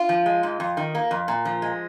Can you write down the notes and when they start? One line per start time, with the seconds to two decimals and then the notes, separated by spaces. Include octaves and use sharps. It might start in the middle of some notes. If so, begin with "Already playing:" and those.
Already playing: F4
0.09 F3
0.26 G#3
0.43 G#2
0.60 F2
0.77 D#3
0.95 A#3
1.11 F2
1.28 A#2
1.45 F3
1.62 G#3